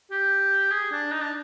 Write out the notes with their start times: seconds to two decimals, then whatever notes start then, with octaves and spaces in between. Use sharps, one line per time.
0.11 G4
0.71 G#4
0.92 D4
1.12 D#4
1.21 D4